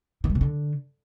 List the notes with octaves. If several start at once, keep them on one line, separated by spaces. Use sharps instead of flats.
D#3
G3
C3
D3